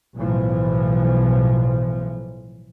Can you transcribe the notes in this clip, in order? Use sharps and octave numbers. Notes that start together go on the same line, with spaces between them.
B1 A2 E3 F3